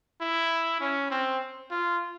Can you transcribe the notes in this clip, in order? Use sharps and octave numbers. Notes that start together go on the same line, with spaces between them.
E4
C#4
C4
F4